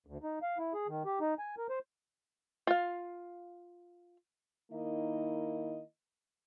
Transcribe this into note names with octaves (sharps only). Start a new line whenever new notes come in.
D2
D#4
F5
E4
G#4
D#3
G4
D#4
G#5
A#4
C5
F4 F5
D#3 A#3 D#4 E4 D#5